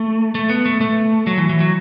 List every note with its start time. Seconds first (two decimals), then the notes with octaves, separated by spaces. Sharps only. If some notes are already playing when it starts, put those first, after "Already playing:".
Already playing: A3
0.35 A3
0.50 B3
0.66 A3
0.81 A3
1.27 F#3
1.37 E3
1.49 E3
1.60 F#3